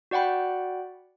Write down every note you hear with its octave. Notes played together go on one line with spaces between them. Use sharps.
F#4 D5 F#5 G5 B5